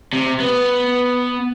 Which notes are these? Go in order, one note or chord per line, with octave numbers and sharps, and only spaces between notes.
C3
B3